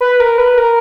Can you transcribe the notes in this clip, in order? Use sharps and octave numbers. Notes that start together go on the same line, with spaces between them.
B4
A#4
B4
A#4